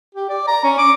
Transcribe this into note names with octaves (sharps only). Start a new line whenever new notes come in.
G4
D5
A#5
C#4
D6